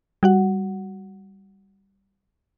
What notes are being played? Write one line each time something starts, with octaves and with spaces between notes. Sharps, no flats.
G3 F#4 F#5